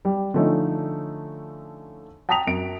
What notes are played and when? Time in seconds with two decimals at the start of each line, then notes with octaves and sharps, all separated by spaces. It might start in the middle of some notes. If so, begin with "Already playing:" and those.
0.05 G3
0.34 D3 F3 A3 C#4 D#4
2.29 G5 A5 A#5 D#6 B6 F7
2.47 F#2 D7